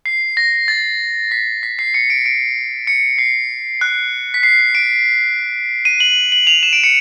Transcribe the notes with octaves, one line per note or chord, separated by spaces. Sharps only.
C7
A#6
A6
B6
B6
C7
C#7
D7
D7
C#7
C7
F#6
B6
C7
D7
D#7
F#7
F#7
F7
E7
D7
C#7